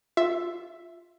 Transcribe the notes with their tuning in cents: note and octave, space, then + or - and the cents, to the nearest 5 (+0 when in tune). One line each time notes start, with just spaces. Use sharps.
F4 +0 E5 +5